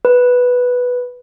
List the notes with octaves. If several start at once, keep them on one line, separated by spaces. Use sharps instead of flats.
B4